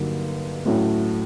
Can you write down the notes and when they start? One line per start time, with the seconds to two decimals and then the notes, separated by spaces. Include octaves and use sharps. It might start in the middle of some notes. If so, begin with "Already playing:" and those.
Already playing: G2 D3 F#3 A#3 D#4
0.66 A2 F#3 A3 C#4 E4